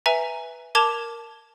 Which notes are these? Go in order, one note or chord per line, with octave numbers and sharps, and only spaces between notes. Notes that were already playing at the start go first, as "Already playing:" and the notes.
B4 E5 G#5 A#5
A#4 A5 D6 G#6 E7 F7